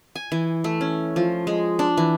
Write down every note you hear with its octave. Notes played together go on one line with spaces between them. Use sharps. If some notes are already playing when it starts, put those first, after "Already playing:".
G#5
E3
A3
C#4
F3
G#3
D4
E3